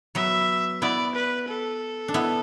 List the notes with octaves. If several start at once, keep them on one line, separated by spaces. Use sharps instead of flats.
F#3 B3 E5
B3 E4 D5
B4
A4
D4
B3 E4